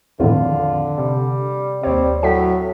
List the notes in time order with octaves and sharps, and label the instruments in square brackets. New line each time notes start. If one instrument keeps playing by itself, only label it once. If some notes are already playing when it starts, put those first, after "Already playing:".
[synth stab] E2 A2 [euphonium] D3 [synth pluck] D#3 F3 C4 [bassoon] F4
[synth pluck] C3 [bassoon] G3
[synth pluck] D#2 C#5 [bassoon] G3 [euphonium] C4
[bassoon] A2 [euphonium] F#3 [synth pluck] G5 B6